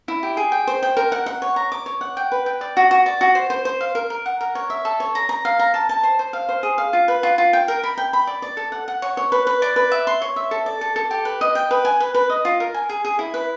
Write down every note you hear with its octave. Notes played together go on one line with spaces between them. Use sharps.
E4
G4
G#4
G5
C5
G5
A#4
F#5
F#5
C#5
A#5
D6
C#5
F#5
G5
B4
G5
D5
F#4
F#4
D5
F#4
C5
C5
C5
F5
A#4
A#4
F#5
A#4
C#5
E5
A4
C#5
A#5
A#5
F5
A#5
A5
A5
C5
C5
F5
C5
G#4
F5
F4
B4
F4
F4
G5
A#4
B5
G5
B5
D5
D5
A4
F#5
F#5
C#5
C#5
B4
B4
D5
B4
E5
C6
C#5
E5
A4
D5
A4
A4
G4
B4
D#5
G5
B4
G#5
B4
B4
D#5
F4
A#4
G#5
G#4
G#4
E4
B4